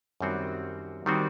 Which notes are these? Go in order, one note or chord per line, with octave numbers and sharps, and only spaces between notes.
F#2 D#3 G3 C4 F#4
D#3 G3 C4 F#4